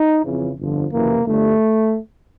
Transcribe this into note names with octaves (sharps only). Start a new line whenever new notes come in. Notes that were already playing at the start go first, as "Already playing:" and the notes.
Already playing: D#4
F2 C#3 E3
G1 F2 D3 F3
F#1 F2 C3 E3 A#3
G1 G2 D3 A3